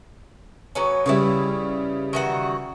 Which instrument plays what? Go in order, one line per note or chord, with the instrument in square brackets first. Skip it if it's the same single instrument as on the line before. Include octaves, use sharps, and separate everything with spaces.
[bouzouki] F#3 B3 C#4
[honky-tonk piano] C#3 G3 [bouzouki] E4 B4 C#5
[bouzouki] D#3 E3 F#4